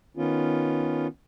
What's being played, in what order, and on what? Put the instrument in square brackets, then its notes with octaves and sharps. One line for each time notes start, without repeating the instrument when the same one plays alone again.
[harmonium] D#3 B3 C#4 F4